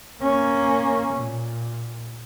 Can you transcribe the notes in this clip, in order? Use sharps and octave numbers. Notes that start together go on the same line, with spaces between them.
A#3 C#4
A#2